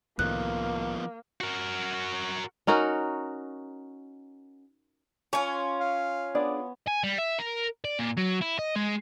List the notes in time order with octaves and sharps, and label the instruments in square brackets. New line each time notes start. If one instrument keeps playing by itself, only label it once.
[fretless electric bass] C2 A2 D#3 [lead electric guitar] F3 B3 [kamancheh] A#3 [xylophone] F#6
[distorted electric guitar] F#4 A#4
[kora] C#4 D#4 F#4 A#4
[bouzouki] C#4 F4 [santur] C#5 G#5
[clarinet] F5
[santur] B3 [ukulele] D4 G#4 D5
[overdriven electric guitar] G#5
G3
E5
A#4
D5
A#2
F#3
E4
D#5
G#3